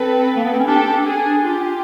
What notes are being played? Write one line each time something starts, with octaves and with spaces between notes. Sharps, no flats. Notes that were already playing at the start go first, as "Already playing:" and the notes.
Already playing: C4 A4 B4
A#3
B3
C4
C#4
D4 G4 A4
D4
G#4
D4
F4 G4